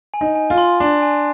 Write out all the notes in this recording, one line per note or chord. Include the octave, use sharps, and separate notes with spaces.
G#5
D#4
G#5
F4
C6
D4 C6
G#5